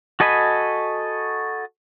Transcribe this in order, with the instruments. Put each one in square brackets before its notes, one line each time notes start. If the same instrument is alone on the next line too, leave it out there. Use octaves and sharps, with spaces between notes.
[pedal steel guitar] F#4 A4 D#5 G#5 B5